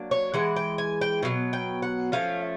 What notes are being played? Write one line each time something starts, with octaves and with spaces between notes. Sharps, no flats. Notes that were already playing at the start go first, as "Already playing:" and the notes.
Already playing: F#3 A#3 D4
C#5
E3 G#3 F#5
G5
G#5
G5
B2 F#3 B3
G5
F#5
F3 A3 C#4 F5